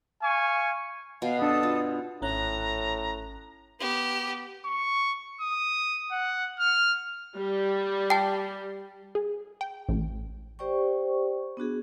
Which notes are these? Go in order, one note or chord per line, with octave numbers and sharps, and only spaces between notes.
F5 G#5 C#6
B2 F5
D4 A4 B4 D#6
F4
G#1 A2 C#4 A#5 F#6
B3 G4
C#6
D#6
F#5
F6
G3
G5 A5
G#4
G5
A1
G4 C5 D5 G5 C#6
B3 D4 F#4 G#4